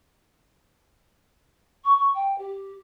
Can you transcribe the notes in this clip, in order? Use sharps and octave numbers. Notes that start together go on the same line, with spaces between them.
C#6
C#6
G5
G4